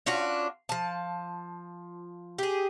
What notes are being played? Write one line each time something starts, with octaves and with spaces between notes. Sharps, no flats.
C#4 D4 F4 F#4
F3 A5
G4 G#4